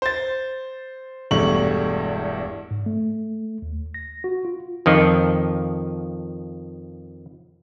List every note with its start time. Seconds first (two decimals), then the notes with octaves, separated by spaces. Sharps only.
0.02 C5 A6
1.31 E1 E2 G2 A3 C#6 F#7
2.71 G#2
2.86 A3
3.62 D#2
3.94 A#6
4.24 F#4
4.45 F4
4.86 F2 D#3 F3